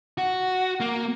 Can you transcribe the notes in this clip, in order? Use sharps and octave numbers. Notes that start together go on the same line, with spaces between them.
F#4
A#3